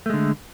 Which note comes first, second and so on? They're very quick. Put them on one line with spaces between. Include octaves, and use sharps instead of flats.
A3 G#3 D3